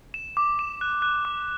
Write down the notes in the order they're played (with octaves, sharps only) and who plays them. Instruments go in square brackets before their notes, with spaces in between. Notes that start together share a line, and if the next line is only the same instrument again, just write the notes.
[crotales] E7
D6
E7
F#6
F#6
D6